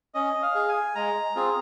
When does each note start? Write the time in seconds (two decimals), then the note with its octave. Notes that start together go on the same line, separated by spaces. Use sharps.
0.14 C#4 D#5
0.42 F5
0.55 G#4
0.69 G#5
0.95 G#3 A#5
1.36 C4 F4 G#4